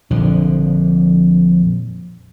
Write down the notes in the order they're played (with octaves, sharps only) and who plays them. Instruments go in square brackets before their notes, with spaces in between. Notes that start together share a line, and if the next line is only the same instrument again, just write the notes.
[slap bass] A#1 F2 D3 F3